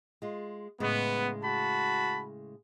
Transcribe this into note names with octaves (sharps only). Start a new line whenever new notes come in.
G#3 F4
A2 C#3 G#3 B3
F#4 A5 B5